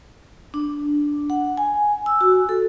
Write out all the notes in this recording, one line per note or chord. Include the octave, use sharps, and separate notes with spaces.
D4
F#5
G#5
E6
F#4
A4